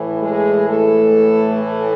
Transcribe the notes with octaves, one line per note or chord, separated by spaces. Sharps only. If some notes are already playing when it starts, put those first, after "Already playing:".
Already playing: A2 E3
G#3 G#4
A3 A4
A3 A4